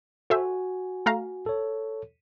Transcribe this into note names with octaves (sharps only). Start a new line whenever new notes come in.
F#4 A4 C5 E5 G#5
A3 F5 A#5
A4 C#5